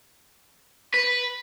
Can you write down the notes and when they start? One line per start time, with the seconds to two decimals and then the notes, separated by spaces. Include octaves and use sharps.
0.94 B4